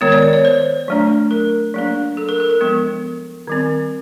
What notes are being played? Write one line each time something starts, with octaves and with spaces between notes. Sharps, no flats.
D#3 G#3 B3 C#5
D5
D5
C#5
C5
F#3 A3 D4
A#4
F#3 A#3 D4
A4
A#4
A4
A#4
F3 G#3 B3
D#3 G3 C4